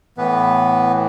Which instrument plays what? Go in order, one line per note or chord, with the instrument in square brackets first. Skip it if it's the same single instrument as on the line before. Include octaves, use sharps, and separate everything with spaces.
[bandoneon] A2 E3 B3 B4